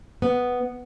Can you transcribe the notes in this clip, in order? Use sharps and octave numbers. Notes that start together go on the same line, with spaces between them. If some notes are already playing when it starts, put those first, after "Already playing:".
B3